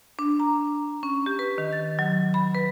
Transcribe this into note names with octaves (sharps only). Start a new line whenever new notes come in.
D4
A#5
C#4
G4
B4
D#3
A6
F#3
B5
B4